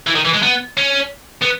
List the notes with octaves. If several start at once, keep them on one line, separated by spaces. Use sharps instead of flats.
E3
D#3
E3
G#3
B3
C#4
B3